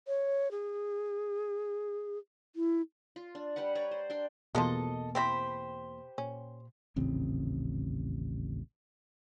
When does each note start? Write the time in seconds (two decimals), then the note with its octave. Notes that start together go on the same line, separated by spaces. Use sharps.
0.07 C#5
0.51 G#4
2.56 E4
3.16 F4
3.35 D4
3.56 G3 G4 B4 F#5
3.75 B4 C#5 D5 A#5
3.91 C5
4.10 D4 G5 C6
4.55 E2 B2 F3 G#3 A#3 A4 D#5
5.15 E3 C4 G4 C5 B5
6.18 A#2 C#4
6.96 D#1 A1 C#3 C4